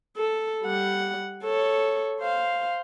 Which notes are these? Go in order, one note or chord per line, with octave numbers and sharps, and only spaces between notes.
A4
G3 F#5
A4 C#5
C5 F5